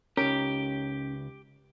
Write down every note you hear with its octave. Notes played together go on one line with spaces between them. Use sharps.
C#2 C#4 D#4 G4 A#4